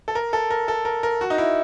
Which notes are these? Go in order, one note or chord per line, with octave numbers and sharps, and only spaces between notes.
A4
A#4
A4
A#4
A4
A#4
A#4
F#4
D#4
E4